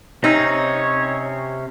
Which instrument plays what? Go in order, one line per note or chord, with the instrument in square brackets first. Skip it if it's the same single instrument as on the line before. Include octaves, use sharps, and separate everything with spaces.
[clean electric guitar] C3 C4 C#4 [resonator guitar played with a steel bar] D#4 [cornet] C#5